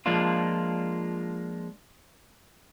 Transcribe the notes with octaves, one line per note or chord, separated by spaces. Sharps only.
F3 G#3 A#3 D4 F4